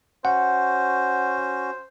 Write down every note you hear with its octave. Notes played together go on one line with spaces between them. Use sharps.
C#4 F#4 C5 F#5